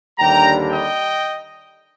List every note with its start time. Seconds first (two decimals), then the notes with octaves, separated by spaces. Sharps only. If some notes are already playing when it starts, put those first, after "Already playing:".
0.19 D#2 D3 G3 D4 G5 A#5
0.70 D#5 G5